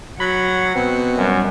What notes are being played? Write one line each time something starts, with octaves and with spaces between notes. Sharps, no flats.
F#3 F#5 B5
B2 C4
F#2 G3